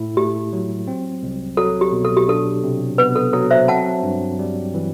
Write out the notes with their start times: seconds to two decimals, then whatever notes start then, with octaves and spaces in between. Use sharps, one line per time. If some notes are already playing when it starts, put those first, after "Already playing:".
Already playing: A2 E4
0.17 A3 G4
0.53 F#3
0.87 C4
1.23 C2
1.57 F#3 A4
1.81 G4
1.92 B2
2.05 A4
2.17 G4
2.28 D4 A4
2.63 C3
2.98 B3 B4
3.16 A4
3.33 F#3 A4
3.50 C5 E5
3.68 C4 F#5 A5
4.03 G2
4.39 G3
4.74 E3